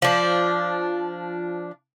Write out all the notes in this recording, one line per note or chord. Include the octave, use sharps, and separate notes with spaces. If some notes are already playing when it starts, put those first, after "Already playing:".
F3 D4